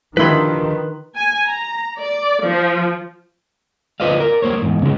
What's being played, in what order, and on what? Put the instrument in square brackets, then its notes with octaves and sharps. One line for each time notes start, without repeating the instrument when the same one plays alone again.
[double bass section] D#3 [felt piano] F3 D4 G4 [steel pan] E4 B5 [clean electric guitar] B4 C6
[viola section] G#5
A#5
D5
F3
[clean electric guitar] F4 B4 C5 D5 D#5 F5
A#4 D5
G3 A#3 C5 C#5
E2 G#2
C#3 G#3